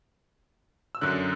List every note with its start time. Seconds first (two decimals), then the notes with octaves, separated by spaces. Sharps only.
0.95 E6
1.01 F#2 D3 F#6